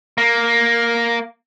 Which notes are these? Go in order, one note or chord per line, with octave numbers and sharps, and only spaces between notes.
A#3